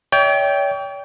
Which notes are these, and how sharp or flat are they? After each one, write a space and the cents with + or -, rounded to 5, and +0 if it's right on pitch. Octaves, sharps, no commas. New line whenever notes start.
C#5 +45 E5 -40 G5 +0